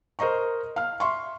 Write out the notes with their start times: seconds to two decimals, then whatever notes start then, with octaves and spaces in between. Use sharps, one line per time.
0.19 A#4 C5 D#5 A#5 C#6
0.76 F5 F6
1.00 E5 C6 C#6